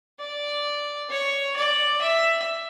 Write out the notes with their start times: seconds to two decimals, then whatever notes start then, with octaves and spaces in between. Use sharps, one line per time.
0.19 D5
1.10 C#5
1.56 D5
2.02 E5